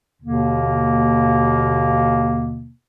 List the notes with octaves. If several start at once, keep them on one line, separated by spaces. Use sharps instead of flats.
D#2 B2 D3 A#3